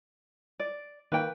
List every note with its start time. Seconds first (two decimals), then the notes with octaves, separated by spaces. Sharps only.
0.59 D5
1.12 D#3 A#3 B4 G5